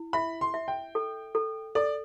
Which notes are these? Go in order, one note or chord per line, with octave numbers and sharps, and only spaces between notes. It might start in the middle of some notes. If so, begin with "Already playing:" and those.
Already playing: E4
E5 B5
C6
E5
G5
A4
A4
A4 D5